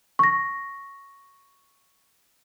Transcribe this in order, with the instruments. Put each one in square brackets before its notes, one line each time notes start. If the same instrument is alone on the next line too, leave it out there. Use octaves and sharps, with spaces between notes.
[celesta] C#6 A#6